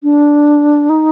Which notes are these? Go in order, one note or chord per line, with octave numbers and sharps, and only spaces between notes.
D4
D#4